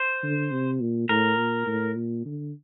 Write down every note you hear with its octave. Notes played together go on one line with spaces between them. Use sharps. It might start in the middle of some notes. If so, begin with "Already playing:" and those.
Already playing: C5
D3
C3
A#2
A2 A#4
A#2
A2
A#2
D3